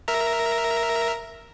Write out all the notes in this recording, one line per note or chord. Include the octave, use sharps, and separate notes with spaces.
A#4 E5 A#5